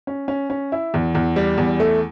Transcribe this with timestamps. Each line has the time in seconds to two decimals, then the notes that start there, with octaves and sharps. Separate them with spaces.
0.07 C#4
0.28 C#4
0.50 C#4
0.72 E4
0.94 E2
1.15 E2
1.36 G3
1.58 E2
1.80 A3